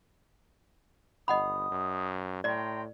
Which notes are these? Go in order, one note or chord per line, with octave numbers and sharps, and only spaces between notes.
G1 D#5 F#5 B5 D#6
F#2
A2 D5 G5 A#5 C6